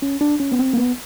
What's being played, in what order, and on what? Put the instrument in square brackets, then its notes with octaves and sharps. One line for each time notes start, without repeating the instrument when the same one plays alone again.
[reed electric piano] C#4
D4
C#4
B3
C4
A#3
B3